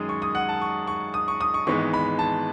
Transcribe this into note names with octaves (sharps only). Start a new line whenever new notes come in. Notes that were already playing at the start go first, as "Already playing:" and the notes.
Already playing: F#2 D#3 G#3 D#6
C#6
D#6
F#5
A5
C#6
C#6
D#6
C#6
D#6
C#6
G#1 G#2 E3 G#3 B3 C#6
B5
A5